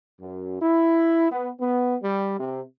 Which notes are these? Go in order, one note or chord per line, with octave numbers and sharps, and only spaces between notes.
F#2
E4
B3
B3
G3
C3